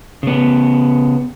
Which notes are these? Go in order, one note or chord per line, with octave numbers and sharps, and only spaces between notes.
C#3 B3